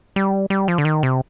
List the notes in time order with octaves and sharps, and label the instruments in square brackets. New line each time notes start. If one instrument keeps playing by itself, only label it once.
[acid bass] G3
G3
F3
D3
D#3
C3